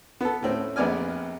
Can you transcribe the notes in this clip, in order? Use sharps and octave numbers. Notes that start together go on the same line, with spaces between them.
B3 A4
A2 C4 C#4
A#1 F2 B3 D5 G#5 F6